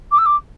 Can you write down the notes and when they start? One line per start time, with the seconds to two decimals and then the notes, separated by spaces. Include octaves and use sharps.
0.11 D6
0.18 E6
0.26 D6